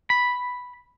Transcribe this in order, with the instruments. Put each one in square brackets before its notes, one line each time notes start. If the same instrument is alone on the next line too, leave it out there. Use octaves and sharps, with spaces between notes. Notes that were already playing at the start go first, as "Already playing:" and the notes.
[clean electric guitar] B5